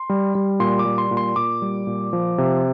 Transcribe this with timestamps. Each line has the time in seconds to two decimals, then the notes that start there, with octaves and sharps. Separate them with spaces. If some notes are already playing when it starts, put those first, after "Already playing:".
Already playing: C6
0.09 G3
0.35 G3
0.60 A#2 C6
0.79 D6
0.85 G3
0.98 C6
1.11 A#2
1.17 C6
1.36 A#2 D6
1.62 G3
1.87 A#2
2.13 F3
2.38 C3